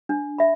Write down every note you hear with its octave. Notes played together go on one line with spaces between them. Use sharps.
D4
E5 B5